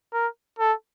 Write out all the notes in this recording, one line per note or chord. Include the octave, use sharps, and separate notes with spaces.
A#4
A4